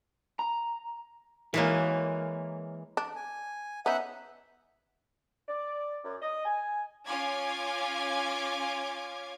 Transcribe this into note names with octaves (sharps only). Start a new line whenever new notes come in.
A#5
E3 G#3 A#3 A#4 C#5
D4
G#5
B3 C#4 D#4 E5 F#5
D5
F#2
D#5
G#5
C#4 F4 F5 G#5 D6 G#6